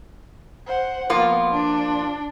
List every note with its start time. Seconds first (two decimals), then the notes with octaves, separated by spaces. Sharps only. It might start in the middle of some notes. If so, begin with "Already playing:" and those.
0.67 C5 F#5
1.10 F3 A#3 B3 F4
1.53 D4